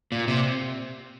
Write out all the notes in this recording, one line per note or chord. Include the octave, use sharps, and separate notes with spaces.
A#2
C3